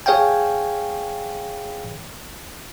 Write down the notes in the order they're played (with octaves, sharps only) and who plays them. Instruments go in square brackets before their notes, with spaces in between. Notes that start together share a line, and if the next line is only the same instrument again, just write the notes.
[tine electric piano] G#4 C#5 F5 G5 G#5